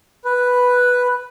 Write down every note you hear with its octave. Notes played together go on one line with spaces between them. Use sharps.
B4